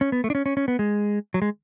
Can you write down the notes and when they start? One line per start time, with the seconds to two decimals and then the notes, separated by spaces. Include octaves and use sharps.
0.01 C#4
0.12 B3
0.24 A3
0.30 D4
0.35 C#4
0.46 C#4
0.57 C#4
0.68 B3
0.79 G#3
1.34 F#3
1.42 G#3